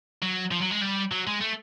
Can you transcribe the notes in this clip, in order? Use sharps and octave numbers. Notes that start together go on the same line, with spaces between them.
F#3
F3
F#3
G#3
G3
F#3
G#3
A3